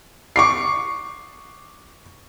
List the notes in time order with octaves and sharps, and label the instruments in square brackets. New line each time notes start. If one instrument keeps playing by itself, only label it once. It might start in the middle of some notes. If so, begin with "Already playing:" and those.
[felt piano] C#6 D6 C7